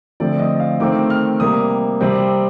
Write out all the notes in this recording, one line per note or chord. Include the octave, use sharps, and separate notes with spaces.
D3 F3 A3 C4 D5
D#5
F5
D#3 A3 C4 D6
F6
C3 G3 A#3 D#6
C3 G3 C4